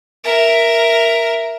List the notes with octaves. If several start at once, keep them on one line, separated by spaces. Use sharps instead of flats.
A#4 E5